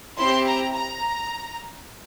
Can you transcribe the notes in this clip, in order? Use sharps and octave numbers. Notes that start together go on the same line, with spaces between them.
C4 E4 G4 C6
A#5
A#5